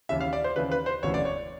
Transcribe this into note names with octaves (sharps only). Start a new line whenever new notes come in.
D#2 C#3 E3 E5
F5
D5
C5
D#2 C#3 E3 B4
B4
C5
E1 D2 C#3 E3 C#5
D5
C#5